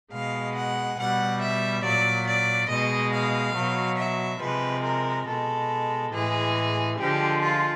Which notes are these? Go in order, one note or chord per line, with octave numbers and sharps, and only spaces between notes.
B2 G#3 F5
F#5
B2 G3 F#5
E5
A#2 F#3 D5
D5
B2 G#3 D#5
F5
B2 F#3
E5
C3 F3 G#3 B4
A#4
B2 G#3 A4
A2 E3 G#3 G#4
D3 F3 G#3 G4
F4